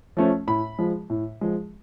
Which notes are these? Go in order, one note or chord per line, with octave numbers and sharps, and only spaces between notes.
F3 A3 C#4
A2 B5
F3 G#3
A2
F3 G#3